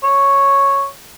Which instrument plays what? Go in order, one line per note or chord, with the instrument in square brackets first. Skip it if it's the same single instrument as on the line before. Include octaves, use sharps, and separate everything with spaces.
[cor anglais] C#5